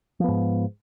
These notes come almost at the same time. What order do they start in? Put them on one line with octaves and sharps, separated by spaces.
F3 B3 G#2